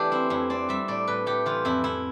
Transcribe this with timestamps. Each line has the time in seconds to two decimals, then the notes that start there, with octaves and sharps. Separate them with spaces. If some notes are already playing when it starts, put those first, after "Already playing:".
Already playing: E3 A3 D4 G4
0.12 C4 E4
0.30 F2 E4
0.50 C4 D5
0.69 G3 E5
0.88 A2 D5
1.08 A2 B4
1.26 A3 G4
1.46 E3 F4
1.65 F2 E4
1.84 F2 E4